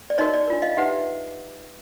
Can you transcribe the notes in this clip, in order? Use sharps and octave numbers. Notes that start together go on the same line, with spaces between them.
D5
D#4 F#4 A#4 C#5 D#5
D5
D4 F4 A#4
D#5 F5
D#4 G4 B4 E5 F#5